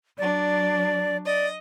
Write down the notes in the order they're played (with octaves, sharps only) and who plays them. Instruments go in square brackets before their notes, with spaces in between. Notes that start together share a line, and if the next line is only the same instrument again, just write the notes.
[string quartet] F#3 D4 [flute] D5
[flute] D5 [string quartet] D#5